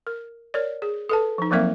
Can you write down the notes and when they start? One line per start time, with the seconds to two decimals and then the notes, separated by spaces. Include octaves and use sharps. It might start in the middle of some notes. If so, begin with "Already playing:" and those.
0.07 A#4
0.54 A#4 C#5 D5
0.82 G#4
1.09 A4 B4 A5
1.38 F3 D#4
1.51 F3 F#3 A#3 C4 A#4 E5